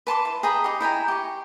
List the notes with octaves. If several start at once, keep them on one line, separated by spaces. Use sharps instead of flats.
B4 A5 C6 D6
E4
G#4 G5 A#5 B5
D#4 G4
E4 G5 G#5 A#5
G4 C#6